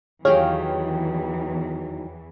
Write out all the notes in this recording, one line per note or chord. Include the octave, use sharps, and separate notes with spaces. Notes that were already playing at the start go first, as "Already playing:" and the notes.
E2 D#3 E3 F#3 G4 G#4 C#5 F5